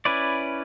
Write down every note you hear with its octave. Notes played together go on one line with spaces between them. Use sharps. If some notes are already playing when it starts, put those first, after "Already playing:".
C#4 E4 B4 D5